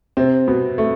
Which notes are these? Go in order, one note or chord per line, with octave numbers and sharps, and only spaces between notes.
C3 C4
B2 B3
A3